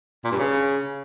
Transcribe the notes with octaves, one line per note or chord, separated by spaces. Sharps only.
A#2
G2
C#3